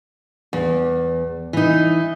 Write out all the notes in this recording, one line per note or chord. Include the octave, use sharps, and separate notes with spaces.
E2
E3 D#4